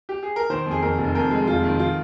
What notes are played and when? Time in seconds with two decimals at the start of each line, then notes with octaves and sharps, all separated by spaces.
0.09 G4
0.23 G#4
0.36 A#4
0.50 D#3 C5
0.66 F2
0.71 G#4
0.82 F2 A#4
0.99 F1
1.15 F2 A#4
1.31 G#3
1.47 F2 F4
1.63 D#3
1.79 F4